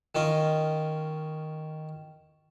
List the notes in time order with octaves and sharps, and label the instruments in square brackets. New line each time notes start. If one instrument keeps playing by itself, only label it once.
[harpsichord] D#3 C#4 F4 D#5